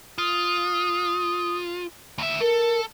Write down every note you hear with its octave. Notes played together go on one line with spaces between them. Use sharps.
F4 D#6
D2 E5
A4 A#4